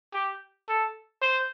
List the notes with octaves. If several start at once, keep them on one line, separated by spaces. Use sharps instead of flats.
G4
A4
C5